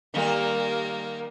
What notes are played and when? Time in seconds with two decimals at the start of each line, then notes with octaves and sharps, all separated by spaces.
0.14 D#3 G3 A#3 A#4